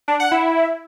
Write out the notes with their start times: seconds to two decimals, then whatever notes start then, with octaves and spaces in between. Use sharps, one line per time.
0.08 D4
0.20 F#5
0.32 E4